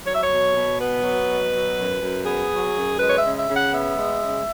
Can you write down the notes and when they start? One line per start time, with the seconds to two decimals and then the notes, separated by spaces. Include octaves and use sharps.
0.05 F#3 C#5
0.14 E5
0.21 C#5
0.30 B2
0.54 B2
0.78 B3 B4
1.03 F#3
1.27 B2
1.52 F#3
1.77 F#2
2.02 F#2
2.25 B3 G#4
2.51 F#3
2.75 F#2
2.99 G#3 B4
3.08 C#5
3.18 E5
3.24 C#3
3.36 E5
3.49 C#3
3.55 F#5
3.73 B3 E5
3.97 G#3
4.22 C#3